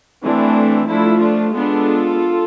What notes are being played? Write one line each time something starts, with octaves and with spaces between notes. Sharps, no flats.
E3 A3 C4 D4
F3 A3 D4 E4
D4 F4
G#3 B3 D4 F4 A4